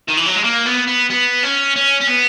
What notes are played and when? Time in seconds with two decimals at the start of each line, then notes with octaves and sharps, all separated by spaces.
0.08 D#3
0.17 E3
0.26 F#3
0.35 G#3
0.44 A#3
0.66 B3
0.87 B3
1.10 B3
1.43 C#4
1.76 C#4
2.01 C#4
2.08 B3